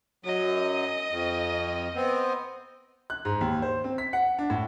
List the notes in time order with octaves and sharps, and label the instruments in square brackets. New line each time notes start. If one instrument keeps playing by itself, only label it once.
[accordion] F#2 F#3 [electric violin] D#5
[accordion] F2
B3 C4
[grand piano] F#6
G#2
D#2
C5
C4
B6
F#5
D4
A2